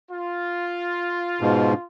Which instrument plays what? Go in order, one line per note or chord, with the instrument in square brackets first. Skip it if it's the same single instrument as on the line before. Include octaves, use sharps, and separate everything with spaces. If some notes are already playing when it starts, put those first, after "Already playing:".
[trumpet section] F4
[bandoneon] G#2 B2